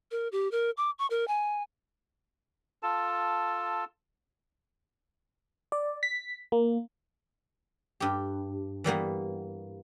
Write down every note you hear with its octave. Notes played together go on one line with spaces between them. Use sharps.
A#4
G4
A#4
D6
C#6
A#4
G#5
F4 A4 A5
D5
B6
A#3
G2 G4
E3 G3 A#3 B3